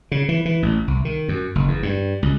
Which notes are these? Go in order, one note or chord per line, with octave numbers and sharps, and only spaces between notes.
C#3
E3
E3
A1
C2
D#3
F#2
F#1
E2
G2
C#2